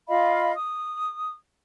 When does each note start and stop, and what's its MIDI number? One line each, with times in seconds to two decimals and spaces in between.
0.08 0.52 65
0.08 0.52 75
0.08 0.52 77
0.08 0.52 83
0.56 1.35 87